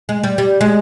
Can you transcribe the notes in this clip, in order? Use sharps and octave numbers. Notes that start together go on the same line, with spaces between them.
G#3
G3
G3
G#3